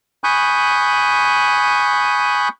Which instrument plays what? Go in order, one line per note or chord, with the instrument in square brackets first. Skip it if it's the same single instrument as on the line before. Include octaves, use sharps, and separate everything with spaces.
[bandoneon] G#5 B5 C#6 D#6 F#6 G6